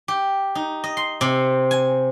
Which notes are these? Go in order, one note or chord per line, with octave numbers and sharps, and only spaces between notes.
G4
D#4
D#5
C6
C3
G#5